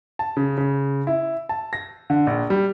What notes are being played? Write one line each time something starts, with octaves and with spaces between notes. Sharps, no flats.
A5
C#3
C#3
E4
A5
A#6
D3
A#1
G3